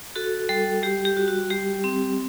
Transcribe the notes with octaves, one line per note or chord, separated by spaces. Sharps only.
F#4 A4
G3 A4
G3 G4
G4
F#4
F#4
G3 G4
C4